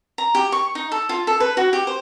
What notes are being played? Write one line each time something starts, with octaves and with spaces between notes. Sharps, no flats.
A#5
G4
C#6
D#4
A4
F4
A4
B4
F#4
G4
C5